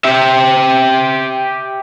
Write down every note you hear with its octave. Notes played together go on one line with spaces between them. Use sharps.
G4 E5